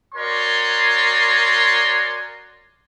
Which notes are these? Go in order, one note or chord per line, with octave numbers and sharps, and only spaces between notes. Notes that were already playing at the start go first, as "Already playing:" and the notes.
F#4 A#4 C#5 D5 G#5 C6